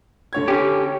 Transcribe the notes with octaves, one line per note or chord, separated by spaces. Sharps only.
D3 C#5 G#6
C#4 G4